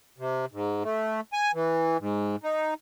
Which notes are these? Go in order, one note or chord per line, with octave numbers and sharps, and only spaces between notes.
C3
G#2
A3
G#5
E3
G#2
D#4